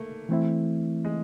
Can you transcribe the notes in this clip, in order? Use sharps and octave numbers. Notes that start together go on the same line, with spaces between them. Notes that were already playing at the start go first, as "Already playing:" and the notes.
Already playing: A3 A#3
E3 A3 C4 E4
G#3